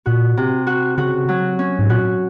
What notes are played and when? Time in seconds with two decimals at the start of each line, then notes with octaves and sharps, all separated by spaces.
0.06 A#2 F#4
0.37 C3
0.67 F#4
0.98 C#3 F#4
1.29 F#3
1.59 C#4
1.79 G#2
1.89 A#2 F#4